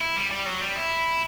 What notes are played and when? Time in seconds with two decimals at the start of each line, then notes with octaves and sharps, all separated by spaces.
0.01 E4
0.16 G3
0.31 G3
0.46 F#3
0.61 G3
0.76 E4